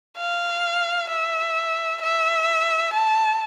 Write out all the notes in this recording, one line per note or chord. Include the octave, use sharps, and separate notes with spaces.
F5
E5
E5
A5